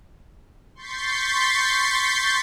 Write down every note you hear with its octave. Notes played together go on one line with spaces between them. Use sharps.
C6 C#6 G6 A6 B6 C7